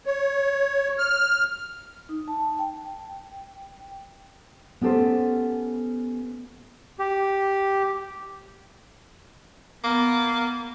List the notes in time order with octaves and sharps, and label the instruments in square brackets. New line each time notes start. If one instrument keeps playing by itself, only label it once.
[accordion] C#5
F6
[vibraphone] D#4
A5
G5
[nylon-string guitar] B3 C#4 G4 A4 C5
[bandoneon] G4
[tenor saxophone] A#3 [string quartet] B3